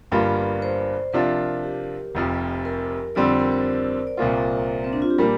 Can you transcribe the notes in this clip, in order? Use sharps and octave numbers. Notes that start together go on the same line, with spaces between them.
G1 G2 G3 A#3 F4 D5
C5
C3 F3 D4 F4 A#4
G4
F1 F2 F3
A#4
F2 D3 G3 C4 D5
C5
A#4
C5
D5
C2 A#2 A#3 F4 C5
C4
D4
F4
G4
A#2 G3 A#3 A#4